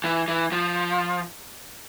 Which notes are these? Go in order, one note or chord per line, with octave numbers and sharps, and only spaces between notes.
E3
E3
F3